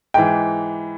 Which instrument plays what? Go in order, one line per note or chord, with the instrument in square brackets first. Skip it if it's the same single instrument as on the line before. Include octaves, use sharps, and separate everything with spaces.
[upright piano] G#2 E3 G5